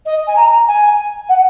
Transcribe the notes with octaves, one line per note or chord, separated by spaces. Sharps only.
D#5
G#5
A#5
G#5
F#5